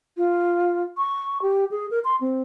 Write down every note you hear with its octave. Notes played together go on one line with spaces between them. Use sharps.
F4
C#6
G4
G#4
A#4
C6
C4